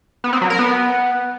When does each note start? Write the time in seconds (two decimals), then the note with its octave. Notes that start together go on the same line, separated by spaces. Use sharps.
0.24 B3
0.33 C4
0.41 F#3
0.50 A#4
0.59 B3